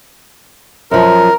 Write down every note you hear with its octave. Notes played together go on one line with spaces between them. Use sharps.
F#2 F3 A#4